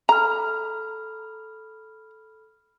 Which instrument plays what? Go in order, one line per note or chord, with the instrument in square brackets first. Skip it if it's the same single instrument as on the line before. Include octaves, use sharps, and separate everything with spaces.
[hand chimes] A4 B5 F6 [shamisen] A#5